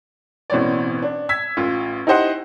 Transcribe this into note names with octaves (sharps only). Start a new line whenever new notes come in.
A1 B2 E3 C4 C#5 D5
D4
E6 G#6 B6
A1 F4
D#4 E4 G4 C5 D#5 F#5